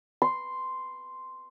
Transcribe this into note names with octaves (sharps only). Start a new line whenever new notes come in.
C6